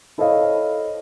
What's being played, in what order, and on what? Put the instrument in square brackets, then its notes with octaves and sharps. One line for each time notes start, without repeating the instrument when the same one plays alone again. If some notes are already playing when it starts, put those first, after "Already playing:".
[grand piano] E4 A4 C5 C#5 D#5 F5